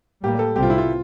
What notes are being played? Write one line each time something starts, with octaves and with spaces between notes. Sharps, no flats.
A2 G3 A#3 G4
A4
C2 C3 G3 C4 G4
F4
E4
F4